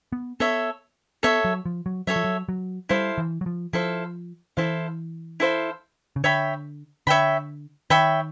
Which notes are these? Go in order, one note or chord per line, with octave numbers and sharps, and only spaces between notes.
B3
B3 A4 C#5 E5
B3 A4 C#5 E5
F#3
F3
F#3
F#3 A4 C#5 E5
F3
F#3
F#3
G3 E4 A4 C5 F5
E3
F#3
F3
F3 E4 A4 C5 F5
E3 E4 A4 C5 F5
E4 A4 C5 F5
C#3
D3 C#5 E5 G5 B5
D3 C#5 E5 G5 B5
D#3 C#5 E5 G5 B5